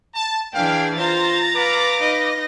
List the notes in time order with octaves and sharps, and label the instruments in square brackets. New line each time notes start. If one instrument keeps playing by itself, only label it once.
[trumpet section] A5
[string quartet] E3 D4 G#4 [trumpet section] F5 [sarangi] G5
[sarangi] F4 [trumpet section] C5 [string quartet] A#5 A6
[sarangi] B4 [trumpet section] F5 D6
[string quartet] D#4 D#5 A#6